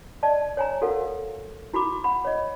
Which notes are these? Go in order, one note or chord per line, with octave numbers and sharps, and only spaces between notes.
D5 D#5 A5
C#5 G#5 A#5
F#4 A4 A#4 F5 F#5
E4 F#4 A#5 B5 D6
F#5 B5
C#5 D#5